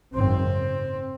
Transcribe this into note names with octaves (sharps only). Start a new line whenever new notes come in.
G#1 F#2 C#3 C4